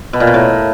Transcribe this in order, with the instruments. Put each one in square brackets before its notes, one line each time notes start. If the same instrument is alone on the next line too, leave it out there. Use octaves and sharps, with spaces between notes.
[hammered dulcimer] B2
A#2
B2
A2